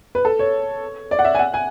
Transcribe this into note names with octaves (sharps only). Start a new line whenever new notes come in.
B4
A4
C#5
D5
F#5
E5
G#5
F#5
G#5